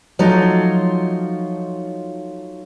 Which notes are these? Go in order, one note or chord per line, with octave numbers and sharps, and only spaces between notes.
F3 F#3 A3 D#4 F4